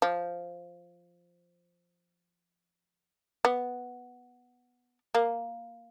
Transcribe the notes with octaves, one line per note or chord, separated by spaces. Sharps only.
F3
B3
A#3